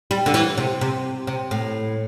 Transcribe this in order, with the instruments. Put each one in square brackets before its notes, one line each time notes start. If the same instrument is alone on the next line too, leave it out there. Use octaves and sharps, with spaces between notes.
[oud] G3
D3
E3
C3
C3
C3
A2